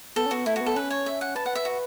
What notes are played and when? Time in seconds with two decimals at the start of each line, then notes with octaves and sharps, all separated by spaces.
0.16 B3 A4
0.26 C#4
0.31 B3 F#4
0.46 A3 E4
0.56 B3 F#4
0.66 A4
0.76 C#4 B4
0.90 C#5
1.06 E5
1.21 F#5
1.35 B4 A5
1.46 F#5
1.55 E5
1.65 F#4